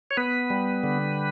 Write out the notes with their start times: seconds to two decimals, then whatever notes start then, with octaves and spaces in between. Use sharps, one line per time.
0.11 C#5
0.17 B3 B4
0.50 G3
0.84 D3